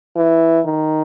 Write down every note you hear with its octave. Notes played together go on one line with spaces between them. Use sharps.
E3
D#3